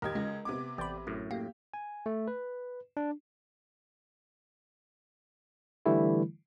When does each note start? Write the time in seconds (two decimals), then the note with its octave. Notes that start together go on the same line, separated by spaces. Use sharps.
0.02 D#2 G4 A#4 D#5 G#6
0.15 C#2 G#3
0.45 C3 B3 D6
0.78 A1 D5 G5 B5
1.07 F#2 A2
1.31 A#3 G4
1.74 G#5
2.06 A3
2.28 B4
2.97 D4
5.86 D3 E3 G3 A3 E4